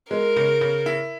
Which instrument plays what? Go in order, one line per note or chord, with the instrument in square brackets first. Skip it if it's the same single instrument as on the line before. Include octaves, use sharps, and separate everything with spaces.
[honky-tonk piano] G#3 [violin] A#4
[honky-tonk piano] C#3
C#3
E4